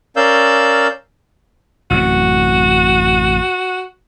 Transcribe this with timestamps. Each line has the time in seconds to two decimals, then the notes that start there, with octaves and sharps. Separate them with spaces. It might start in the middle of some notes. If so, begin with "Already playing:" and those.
0.16 C#4 A#4 D5 F5 E6 G6
1.91 A1 F#2 C3 F#4